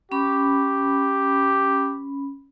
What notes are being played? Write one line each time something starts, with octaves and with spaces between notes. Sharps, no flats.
C#4 G4 B5